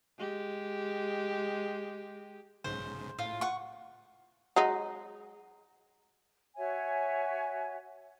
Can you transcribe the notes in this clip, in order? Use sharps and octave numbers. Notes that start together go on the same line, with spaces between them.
G#3 G4
B1 G#2 C#3 C5
A2 F4
F#5 C#6
F#3 G#3 D#4
F#4 C#5 E5 G#5